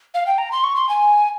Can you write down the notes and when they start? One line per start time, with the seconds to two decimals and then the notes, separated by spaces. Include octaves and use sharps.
0.14 F5
0.26 G5
0.38 A#5
0.52 C6
0.64 C#6
0.76 C6
0.89 G#5